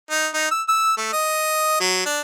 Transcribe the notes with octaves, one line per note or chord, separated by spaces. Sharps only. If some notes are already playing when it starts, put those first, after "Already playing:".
D#4
D#4
E6
E6
A3
D#5
F#3
D4